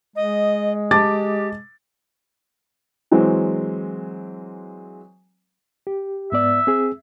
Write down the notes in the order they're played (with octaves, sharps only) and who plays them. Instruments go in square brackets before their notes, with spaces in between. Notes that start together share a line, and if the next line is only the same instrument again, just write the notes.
[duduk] G#3 [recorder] D#5
[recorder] G4 [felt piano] A5 D6 A6
[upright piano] E3 F#3 G#3 C4
[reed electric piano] G4
[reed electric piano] G#2 B3 D5 [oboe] E5
[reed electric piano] C4 G#4